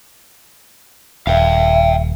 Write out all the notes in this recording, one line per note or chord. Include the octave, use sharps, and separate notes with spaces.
D#1 E5 F5 G5